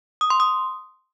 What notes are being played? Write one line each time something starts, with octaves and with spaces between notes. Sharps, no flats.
D#6
C6
D#6